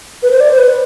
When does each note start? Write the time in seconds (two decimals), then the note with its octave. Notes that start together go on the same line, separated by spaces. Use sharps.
0.23 B4
0.31 C5
0.40 D5
0.50 C5
0.58 B4